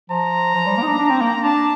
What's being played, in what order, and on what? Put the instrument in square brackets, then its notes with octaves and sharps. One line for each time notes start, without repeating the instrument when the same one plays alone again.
[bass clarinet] F3 [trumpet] A#5
[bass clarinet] F3
G3
A#3
D#4
D4
D4
C4
A#3
[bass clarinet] D4 [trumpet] A5